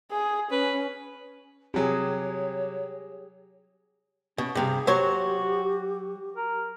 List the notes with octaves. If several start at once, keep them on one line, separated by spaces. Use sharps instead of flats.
G#4
C#4 B4
C3 F#3 G4 G#4 C#5
B2 C#4
G2 C3 G#4
F#3 F#4 G4 C5 C#5
A#4